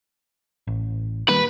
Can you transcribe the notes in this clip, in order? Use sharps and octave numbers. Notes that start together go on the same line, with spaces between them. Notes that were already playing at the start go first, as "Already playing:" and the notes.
A1
D#3 G3 A#3 B4